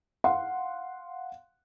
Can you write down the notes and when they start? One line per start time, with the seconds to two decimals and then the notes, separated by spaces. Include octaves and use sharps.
0.24 F5 F#5 C6